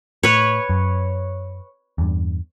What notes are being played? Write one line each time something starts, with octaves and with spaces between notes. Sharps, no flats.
A2 B4 C#5
F#2
E2 G2